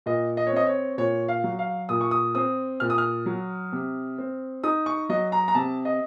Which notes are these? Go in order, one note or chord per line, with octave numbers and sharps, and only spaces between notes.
A#2 D#5
D#5
C#5
C4 D#5
C#5
A#2 C#5
F5
F#3
F5
A#2 D#6
C#6
D#6
C4 D#6
A#2 F6
D#6
F6
F#3
C3
C4
D#4 D#6
C#6
F#3 D#5
A#5
A#5
C3 A5
D#5